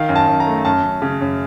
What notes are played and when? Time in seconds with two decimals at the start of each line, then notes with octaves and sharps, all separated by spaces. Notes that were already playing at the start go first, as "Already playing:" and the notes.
Already playing: D#3 F5
0.09 F#2
0.16 A5
0.28 F#2
0.40 A#5
0.47 A3
0.65 F#2 A5
0.83 F#2
1.02 C#3
1.21 F#2